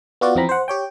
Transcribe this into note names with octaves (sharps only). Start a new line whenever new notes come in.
B3 F4 F#4 D5
F2 E3 C4 A#5 B5
C5 F#5
G4 C#5 G5